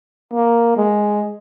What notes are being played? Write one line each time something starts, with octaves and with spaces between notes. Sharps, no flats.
A#3
G#3